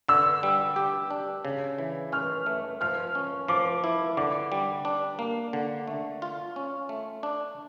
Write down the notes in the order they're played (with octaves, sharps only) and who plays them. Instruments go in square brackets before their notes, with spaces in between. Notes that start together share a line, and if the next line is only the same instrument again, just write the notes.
[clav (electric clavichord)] D3 [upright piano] E6
[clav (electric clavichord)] G3
G4
D4
C#3
E3
[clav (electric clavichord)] C#4 [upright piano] F6
[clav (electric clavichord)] A3
[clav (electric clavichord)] F3 [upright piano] F6
[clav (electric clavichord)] C#4
[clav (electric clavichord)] F3 [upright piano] D6
[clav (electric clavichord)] E4
[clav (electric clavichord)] D3 [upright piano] D6
[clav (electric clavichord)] G3
D4
A#3
D3
A3
F4
C#4
A3
D4